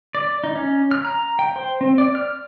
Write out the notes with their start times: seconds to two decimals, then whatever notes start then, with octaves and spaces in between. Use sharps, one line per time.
0.15 D5
0.44 D#4
0.56 C#4
0.91 F6
1.05 A#5
1.39 G5
1.56 C5
1.81 C4
1.98 D5
2.15 F6